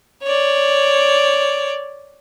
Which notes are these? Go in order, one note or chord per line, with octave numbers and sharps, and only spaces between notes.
C#5 D5